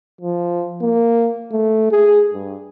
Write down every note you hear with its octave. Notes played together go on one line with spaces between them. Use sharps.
F3
A#3
A3
G#4
G2